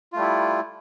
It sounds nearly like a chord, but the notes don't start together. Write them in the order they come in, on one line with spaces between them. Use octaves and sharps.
F4 A3 G3 E4